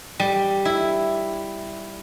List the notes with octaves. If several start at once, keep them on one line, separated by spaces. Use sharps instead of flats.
G3
E4